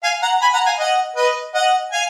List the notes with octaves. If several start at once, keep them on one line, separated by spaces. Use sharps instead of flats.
F5 G#5
F#5 A#5
G#5 B5
F#5 A#5
F5 G#5
D#5 F#5
B4 D#5
D#5 F#5
F5 G#5